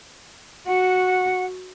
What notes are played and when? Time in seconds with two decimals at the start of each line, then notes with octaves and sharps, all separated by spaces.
0.66 F#4 F#5